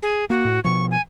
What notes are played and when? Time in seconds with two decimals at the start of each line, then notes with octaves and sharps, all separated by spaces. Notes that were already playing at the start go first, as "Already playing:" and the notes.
0.03 G#4
0.30 A#3 F#4
0.45 A2
0.64 B2 F3 C#6
0.91 G#5